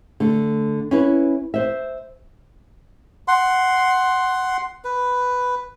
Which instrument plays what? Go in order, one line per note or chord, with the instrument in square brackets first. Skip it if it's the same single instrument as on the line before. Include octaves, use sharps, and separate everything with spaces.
[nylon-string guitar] D3 A3
C#4 E4 B4
C5 E5
[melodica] F#5 C6
B4